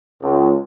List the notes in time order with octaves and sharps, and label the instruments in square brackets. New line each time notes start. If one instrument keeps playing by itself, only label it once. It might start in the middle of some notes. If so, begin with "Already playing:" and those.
[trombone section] C#2